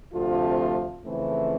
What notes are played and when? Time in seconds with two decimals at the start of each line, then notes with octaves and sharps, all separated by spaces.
0.12 D2 C3 F3 A3 C4 F4
1.05 F2 C#3 E3 A3 C4 E4